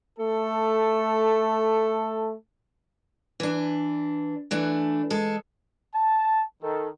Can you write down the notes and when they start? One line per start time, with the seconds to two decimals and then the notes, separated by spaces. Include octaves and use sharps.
0.19 A3 A4
3.40 E3 D4
4.51 E3 A3 D4
5.10 G#3 A4
5.94 A5
6.63 D#3 A4